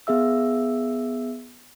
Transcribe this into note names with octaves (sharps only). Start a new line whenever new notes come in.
B3 G#4 E5 E6